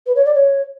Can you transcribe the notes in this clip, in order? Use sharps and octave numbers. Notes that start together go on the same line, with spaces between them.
B4
C#5
D5
C#5